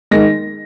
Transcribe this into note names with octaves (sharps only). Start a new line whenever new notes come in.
D#3 G#3 A#6